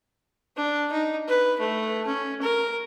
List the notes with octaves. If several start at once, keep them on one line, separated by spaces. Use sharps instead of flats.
D4
D#4
B4
A3
C#4
A#4